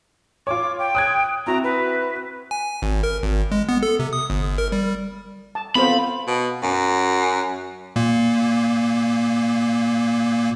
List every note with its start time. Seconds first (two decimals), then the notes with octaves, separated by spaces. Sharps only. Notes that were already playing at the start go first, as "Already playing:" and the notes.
0.47 F4 C#5 D6
0.79 G5
0.95 D#6 F#6 G#6
1.47 C4 E4 F#4 A#5
1.64 B4
2.51 G#5
2.82 G#1
3.03 A#4
3.23 G#1
3.52 G#3
3.69 B3
3.83 A4
3.99 C3
4.13 D#6
4.30 G1
4.58 A#4
4.72 G3
5.55 A5
5.75 B3 C4 F4 A4 A#4 C5 B5
6.28 B2
6.63 F#2
7.96 A#2 A#3